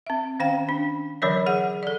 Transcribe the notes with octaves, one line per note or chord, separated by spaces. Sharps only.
C4 E5
D#3 C#4 C5 F5 G5
D4
D3 E3 F#3 A#4 C#5 D5
G#4 F#5
A4 D5